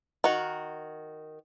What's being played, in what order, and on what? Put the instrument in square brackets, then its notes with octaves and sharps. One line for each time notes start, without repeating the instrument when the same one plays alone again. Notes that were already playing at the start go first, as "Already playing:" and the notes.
[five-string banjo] D#3 F#4